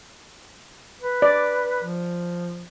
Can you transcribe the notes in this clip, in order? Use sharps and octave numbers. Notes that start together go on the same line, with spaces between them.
B4
D5
F3